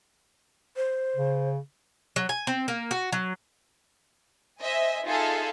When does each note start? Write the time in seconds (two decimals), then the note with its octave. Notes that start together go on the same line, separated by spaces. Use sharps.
0.76 C5
1.16 C#3
2.16 F#3
2.29 G#5
2.47 C4
2.68 A#3
2.91 F#4
3.12 F#3
4.61 C5 D#5 E5 G#5
5.05 D#4 F4 G#4 A4 E5 F5